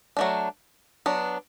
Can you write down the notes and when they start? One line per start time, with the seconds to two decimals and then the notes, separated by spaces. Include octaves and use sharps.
0.17 F#3 A3 D4
1.06 F#3 B3 D4